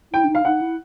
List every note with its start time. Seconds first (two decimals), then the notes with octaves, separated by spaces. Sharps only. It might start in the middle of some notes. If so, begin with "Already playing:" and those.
0.13 E4 G5
0.24 D4
0.29 D#4
0.35 F5
0.45 D#4 F#5
0.61 E4